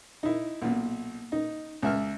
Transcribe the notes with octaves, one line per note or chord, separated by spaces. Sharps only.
D#4 E4
B1 A#2
D#4
C#2 E5 F6